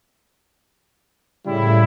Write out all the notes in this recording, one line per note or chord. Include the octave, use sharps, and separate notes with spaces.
A2 C#3 G3 E4